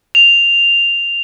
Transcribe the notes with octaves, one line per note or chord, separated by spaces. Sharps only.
F7